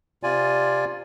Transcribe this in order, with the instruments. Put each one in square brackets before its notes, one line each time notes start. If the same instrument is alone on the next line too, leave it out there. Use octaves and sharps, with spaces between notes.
[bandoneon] C3 F4 D5 G#5